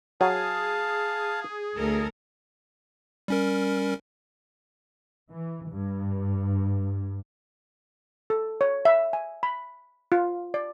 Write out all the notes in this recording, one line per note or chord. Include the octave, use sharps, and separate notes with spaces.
F#3 G#4 F5 A5
D2 A4 A#4
G3 C#4 A#4
E3
G2
A4
C#5
E5
G#5
B5
F4
D5